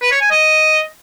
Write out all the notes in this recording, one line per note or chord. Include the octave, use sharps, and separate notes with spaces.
B4
C#5
G#5
D#5